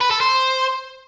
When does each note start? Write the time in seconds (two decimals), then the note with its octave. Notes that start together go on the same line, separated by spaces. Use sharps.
0.01 B4
0.11 A4
0.21 C5